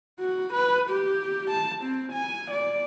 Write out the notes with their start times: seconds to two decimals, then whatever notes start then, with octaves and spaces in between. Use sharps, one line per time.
0.19 F#4
0.53 B4
0.90 G4
1.50 A5
1.83 C4
2.12 G#5
2.51 D5